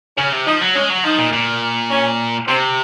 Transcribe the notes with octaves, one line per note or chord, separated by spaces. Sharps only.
C#3 C#4
C3
F3 D#4
F#3
G#3 C#4
F#3
F3 D#4
A#2
A#2
C#4
C3 C4